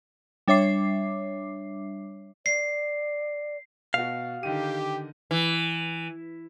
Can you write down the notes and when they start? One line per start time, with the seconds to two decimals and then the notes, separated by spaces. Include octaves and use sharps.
0.48 G3 D4 C#5 E5 D6 C7
2.46 D5 C7
3.94 B2 F#4 F5
4.43 D3 D#3 G4 D#7
5.31 E3